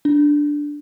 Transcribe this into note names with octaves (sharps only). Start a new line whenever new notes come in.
D4